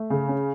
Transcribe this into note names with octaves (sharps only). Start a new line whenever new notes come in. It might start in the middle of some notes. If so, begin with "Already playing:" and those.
Already playing: A3
C#3
C#4